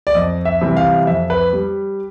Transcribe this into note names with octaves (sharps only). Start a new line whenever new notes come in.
D5
F2 D#5
E5
C3 E3 G3
F5
F2 E5
B4
G3